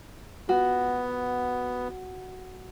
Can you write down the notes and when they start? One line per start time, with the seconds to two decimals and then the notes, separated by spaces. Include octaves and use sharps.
0.49 B3 F#4